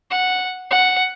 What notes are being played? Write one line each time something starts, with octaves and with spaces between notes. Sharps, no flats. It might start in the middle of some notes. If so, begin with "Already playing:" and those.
F#5
F#5